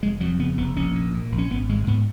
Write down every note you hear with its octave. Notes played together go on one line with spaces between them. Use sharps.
F1 G#3
F2 F#3
C#3 B3
F1 B3
A#1 C#4
A#2
A#2
A#1
C#4
G#1 B3
G#1 G#3
G#2 B3